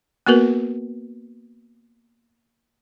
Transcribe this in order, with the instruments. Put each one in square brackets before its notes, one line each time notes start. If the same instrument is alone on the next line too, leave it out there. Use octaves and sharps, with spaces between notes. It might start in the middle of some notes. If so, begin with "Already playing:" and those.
[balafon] A#3 B3 F#4 A#4 B4